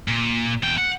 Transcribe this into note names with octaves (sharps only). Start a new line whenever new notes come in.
A#2
E2 G5
F#5